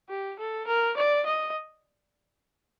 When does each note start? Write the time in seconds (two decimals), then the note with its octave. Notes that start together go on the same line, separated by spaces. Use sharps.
0.09 G4
0.39 A4
0.67 A#4
0.97 D5
1.26 D#5